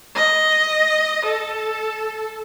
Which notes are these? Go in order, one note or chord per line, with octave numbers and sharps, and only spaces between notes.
D#5
A4